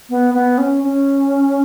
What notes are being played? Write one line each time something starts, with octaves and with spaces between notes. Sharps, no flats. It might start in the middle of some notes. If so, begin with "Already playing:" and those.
B3
B3
C#4
C#4